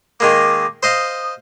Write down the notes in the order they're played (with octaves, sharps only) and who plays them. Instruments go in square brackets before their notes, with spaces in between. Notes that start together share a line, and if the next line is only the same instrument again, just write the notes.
[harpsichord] D#3 G#3 A#3 [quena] D6
[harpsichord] C5 D#5 F5 [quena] D#6